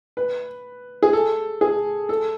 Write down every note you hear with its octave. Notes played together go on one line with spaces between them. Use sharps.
B4
G#4
A4
G#4
A4